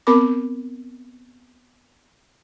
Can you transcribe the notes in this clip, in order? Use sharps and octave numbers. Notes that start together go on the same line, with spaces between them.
B3 C4 A#4 B5 D6